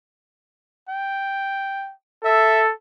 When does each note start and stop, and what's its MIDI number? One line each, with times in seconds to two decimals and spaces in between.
0.88 1.92 79
2.24 2.73 69
2.24 2.63 76